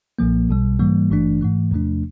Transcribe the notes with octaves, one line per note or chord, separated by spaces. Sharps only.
B1 A#2 F3 A#3
B1 B2 G3
G#2 E3 G3 A#3
G#1 G2 E3 A3 D4
G#2 E3 A3
E2 C3 F3 A3 D4